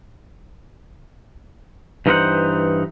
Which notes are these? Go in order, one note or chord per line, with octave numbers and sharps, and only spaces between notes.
G2 E3 D#4 A#4 C5 F#5